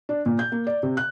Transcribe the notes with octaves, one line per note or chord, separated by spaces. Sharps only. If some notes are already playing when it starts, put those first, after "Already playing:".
D4
A#2
G6
A#3
D5
C3
F#6